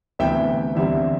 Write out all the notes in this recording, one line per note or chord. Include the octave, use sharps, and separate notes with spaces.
D2 C3 E3 B3 E4 E5 G5
E2 D3 G3 C4 E4 E5